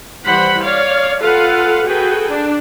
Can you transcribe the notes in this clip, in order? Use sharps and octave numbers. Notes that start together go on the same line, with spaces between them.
E3 G3 C5 F#5 B5
C#5 D5 F5
F4 A4 B4 F5 F#5
F#4 G#4 A4 B4 G5
D4